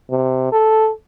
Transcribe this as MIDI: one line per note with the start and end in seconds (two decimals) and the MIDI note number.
0.10 0.47 48
0.52 0.91 69